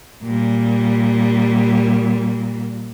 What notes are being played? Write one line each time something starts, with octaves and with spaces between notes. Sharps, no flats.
A#2 G3